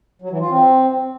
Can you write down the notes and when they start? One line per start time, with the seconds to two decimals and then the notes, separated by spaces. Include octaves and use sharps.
0.22 F#3
0.31 E3
0.41 F4
0.50 C4